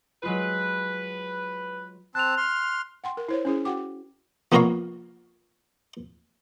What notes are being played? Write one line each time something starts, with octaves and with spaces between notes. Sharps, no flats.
F#3 G#3 F4 B4
C4 A5 F#6 F7
C6 F6
F#5 G5 C6
A#4
E4 C5 C#5
C#4 E4 G#4
F#4 F#5 G5 D6
F3 A#3 B3 A#4 C#5 F5